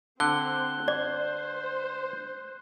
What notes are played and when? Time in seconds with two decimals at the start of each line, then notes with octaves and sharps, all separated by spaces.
0.20 D3 C4 F#6 G7
0.88 C5 D5